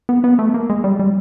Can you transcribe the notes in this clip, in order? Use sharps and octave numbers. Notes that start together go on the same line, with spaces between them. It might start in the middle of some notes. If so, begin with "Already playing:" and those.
B3
B3
A3
A#3
G#3
G3
G3